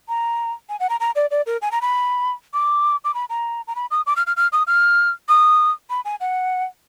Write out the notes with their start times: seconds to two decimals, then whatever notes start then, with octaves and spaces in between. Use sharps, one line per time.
0.09 A#5
0.69 G#5
0.80 F#5
0.90 A#5
1.00 A#5
1.16 D5
1.31 D5
1.46 A#4
1.62 G#5
1.72 A#5
1.82 B5
2.54 D6
3.05 D6
3.14 B5
3.30 A#5
3.68 A#5
3.76 B5
3.91 D#6
4.06 D6
4.16 F6
4.27 F6
4.37 F6
4.52 D#6
4.67 F6
5.29 D#6
5.90 B5
6.05 G#5
6.20 F#5